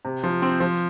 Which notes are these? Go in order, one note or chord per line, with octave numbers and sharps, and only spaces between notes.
C3
F3
C4
F3